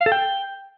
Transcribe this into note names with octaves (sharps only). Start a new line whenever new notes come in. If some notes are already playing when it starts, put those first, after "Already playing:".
F5
A4
G5